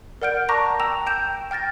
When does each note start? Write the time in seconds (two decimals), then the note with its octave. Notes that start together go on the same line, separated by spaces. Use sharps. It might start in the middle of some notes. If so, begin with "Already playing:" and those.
0.22 A#4 D5 F#5 F6 G6 D7
0.49 A5 A#5 C#6 D6 F#6 A#6
0.80 G5 E6 A#6 E7 F7
1.06 G5 G6 E7
1.51 G5 F6 A6 A#6